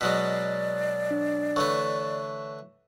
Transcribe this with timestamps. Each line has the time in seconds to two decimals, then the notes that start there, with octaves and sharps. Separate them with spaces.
0.01 B2 F#3 G#3 D5 B6
1.11 D4
1.56 D3 E3 A3 C#5 C#6